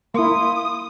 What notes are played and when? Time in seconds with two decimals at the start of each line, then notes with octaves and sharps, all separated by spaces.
0.14 A#3 E4 C6 D#6